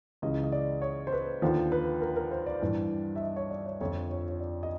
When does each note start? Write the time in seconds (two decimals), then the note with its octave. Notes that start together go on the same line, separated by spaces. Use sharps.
0.22 C#2 C#3 E3 D#5
0.44 D#5
0.52 D5
0.82 C#5
1.07 C5
1.13 B4
1.42 D#2 D3 F3 C5
1.72 B4
2.02 A#4
2.16 A#4
2.31 C5
2.46 D5
2.62 G2 E3
3.16 E5
3.21 D#5
3.36 C#5
3.50 D5
3.66 C#5
3.81 F2 D3 F3 C#5
4.11 C#5
4.29 C#5
4.40 D5
4.63 D#5